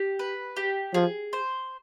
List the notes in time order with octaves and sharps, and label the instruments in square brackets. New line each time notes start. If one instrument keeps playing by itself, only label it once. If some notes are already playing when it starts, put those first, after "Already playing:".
Already playing: [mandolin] G4
B4
G4
[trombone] F3 [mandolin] G#4
[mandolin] C5